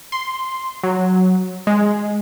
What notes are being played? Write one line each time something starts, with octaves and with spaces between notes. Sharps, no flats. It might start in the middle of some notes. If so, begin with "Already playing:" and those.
C6
F#3
G#3